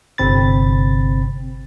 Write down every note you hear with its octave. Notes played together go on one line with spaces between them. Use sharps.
G1 C3 C4 B5 A6